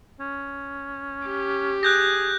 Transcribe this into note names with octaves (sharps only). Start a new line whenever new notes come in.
C#4
G4
G#4 F#6 G6 A#6